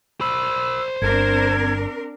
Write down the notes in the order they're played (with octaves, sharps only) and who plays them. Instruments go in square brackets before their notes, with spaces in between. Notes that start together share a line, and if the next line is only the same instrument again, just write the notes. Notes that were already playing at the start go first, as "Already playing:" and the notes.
[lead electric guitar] C5 B5 [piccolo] E6
[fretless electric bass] G1 [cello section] C4 D4 A#4 [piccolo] G#6